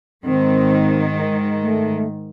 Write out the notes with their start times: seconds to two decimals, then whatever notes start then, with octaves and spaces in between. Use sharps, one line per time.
0.24 G#2 D#3 C4
1.62 A3